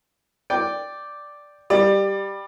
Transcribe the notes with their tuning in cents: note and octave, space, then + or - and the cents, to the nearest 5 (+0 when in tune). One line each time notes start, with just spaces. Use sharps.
D5 +0 G5 +0
G3 +0 D5 +25